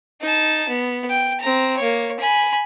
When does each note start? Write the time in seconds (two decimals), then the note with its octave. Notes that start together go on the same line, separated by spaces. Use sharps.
0.21 D#4 A5
0.69 B3
1.10 G5
1.40 C4 A#5
1.77 A#3 C#5
2.19 G#5 B5